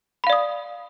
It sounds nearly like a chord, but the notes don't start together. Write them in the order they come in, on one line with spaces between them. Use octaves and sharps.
B5 F5 D5 D#6